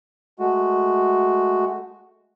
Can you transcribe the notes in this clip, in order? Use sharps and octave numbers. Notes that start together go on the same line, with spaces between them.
G#3 A3 F#4